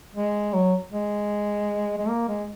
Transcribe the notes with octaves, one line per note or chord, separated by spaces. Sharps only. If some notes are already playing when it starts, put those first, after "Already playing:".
G#3
F#3
G#3
G#3
A#3
G#3